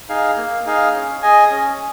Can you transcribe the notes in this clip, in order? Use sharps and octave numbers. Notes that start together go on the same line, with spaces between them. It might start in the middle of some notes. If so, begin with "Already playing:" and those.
D#4 G#4 F5
A#3
D#4 G#4 F5
C#4
G#4 D#5 G#5
C#4